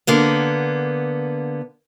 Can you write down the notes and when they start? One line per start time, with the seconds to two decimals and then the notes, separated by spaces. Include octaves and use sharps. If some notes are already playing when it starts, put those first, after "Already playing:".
0.07 D3 A#3 B3